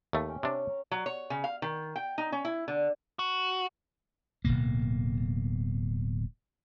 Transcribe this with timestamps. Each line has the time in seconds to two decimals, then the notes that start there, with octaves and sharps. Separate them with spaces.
0.13 D#2 A3
0.29 C#4 G4 G5
0.43 C3 D4 C#5
0.69 A#5
0.91 F#3
1.06 C#5
1.30 C#3
1.44 F5
1.62 D#3
1.96 G5
2.18 D#4
2.32 C#4
2.45 E4
2.68 D3
3.19 F#4
4.45 D1 G#2 B2 A#3